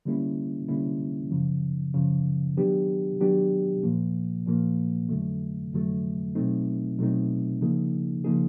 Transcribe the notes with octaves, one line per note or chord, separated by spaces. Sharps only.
D3 G3 A#3 C#4 E4
D3 G3 A#3 C#4 E4
F#2 C#3 F3
F#2 C#3 F3
D#3 F#3 B3 D4 G4
D#3 F#3 B3 D4 G4
A#2 F3 A#3
A#2 F3 A#3
F2 D3 F#3 A3
F2 D3 F#3 A3
B2 F#3 A3 C4 D#4
B2 F#3 A3 C4 D#4
C#3 F3 A#3 D#4 G#4
C#3 F3 A#3 D#4 G#4